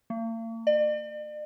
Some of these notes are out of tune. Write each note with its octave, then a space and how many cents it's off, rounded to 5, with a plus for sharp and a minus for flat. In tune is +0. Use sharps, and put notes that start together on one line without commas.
A#3 -45
D5 +45